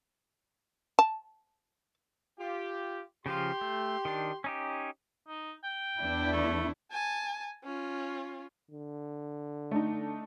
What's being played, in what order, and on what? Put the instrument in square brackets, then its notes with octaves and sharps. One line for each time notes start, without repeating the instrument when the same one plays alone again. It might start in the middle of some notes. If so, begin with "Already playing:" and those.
[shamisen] A5
[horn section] F4 G4
[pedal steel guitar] C#3 F3 F4 [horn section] G4 C6
[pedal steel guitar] A3
D#3 D4
C#4 D#4 G4
[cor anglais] D#4
G5
[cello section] E2 D4 E4
[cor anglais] A3
[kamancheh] G#5 A5
C#4 F4
[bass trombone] D3
[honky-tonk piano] A3 D4 D#4